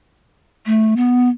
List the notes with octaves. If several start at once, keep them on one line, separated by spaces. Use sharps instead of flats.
A3
B3